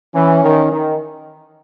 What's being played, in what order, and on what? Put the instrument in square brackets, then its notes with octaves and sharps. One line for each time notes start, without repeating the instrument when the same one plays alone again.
[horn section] E3 [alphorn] C#4
[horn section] D#3
D#3